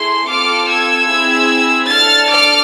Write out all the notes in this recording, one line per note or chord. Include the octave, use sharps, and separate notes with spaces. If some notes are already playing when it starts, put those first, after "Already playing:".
Already playing: A3 E4 G#4 C6
C4 F4 A4 D6 F6
E6 G#6
C4 E4 G#4
D4 A4 F6 A6
D6 F6